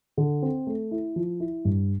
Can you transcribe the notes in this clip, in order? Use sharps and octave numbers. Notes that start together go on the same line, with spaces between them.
D3
C4
A3
E4
F3
E4
G2